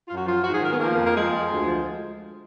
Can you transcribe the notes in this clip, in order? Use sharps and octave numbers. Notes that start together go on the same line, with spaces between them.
F#2 F4
F#4
F3 F4
G#2 F#4
G#4
D#3 A#4
B3
F3 A#3
F2
A#3
F3 G#3
F3
D2
F3